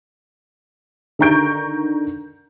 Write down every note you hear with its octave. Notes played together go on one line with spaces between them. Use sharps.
D3 D#3 A#5 C#6 G6 D7